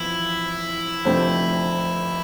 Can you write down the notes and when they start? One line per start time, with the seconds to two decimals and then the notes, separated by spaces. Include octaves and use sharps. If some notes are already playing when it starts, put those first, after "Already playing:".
Already playing: F2 E3 B3 E4 F4
1.05 F1 F2 D3 A3 C4